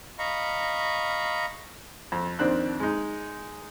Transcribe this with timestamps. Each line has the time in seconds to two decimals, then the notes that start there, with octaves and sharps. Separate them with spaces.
0.19 D#5 F5 A#5 B5 C#6
2.12 F2
2.39 F2 D#3 C4 D4 F#6
2.80 G#3 D#4